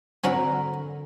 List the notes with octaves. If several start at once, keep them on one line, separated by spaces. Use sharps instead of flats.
D3 C4 C#4 F#4 A#4 B5